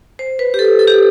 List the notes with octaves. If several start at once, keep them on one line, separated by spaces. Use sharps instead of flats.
C5
B4
G4
A4
A4
G4